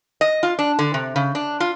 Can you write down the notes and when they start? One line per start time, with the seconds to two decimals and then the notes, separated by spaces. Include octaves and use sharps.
0.21 D#5
0.43 F4
0.59 D4
0.79 D3
0.94 C3
1.16 C#3
1.35 D4
1.60 F4